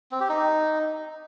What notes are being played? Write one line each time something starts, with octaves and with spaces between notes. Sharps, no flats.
C4
G4
D#4